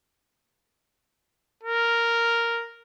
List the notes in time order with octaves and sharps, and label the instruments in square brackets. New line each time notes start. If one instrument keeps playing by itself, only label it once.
[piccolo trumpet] A#4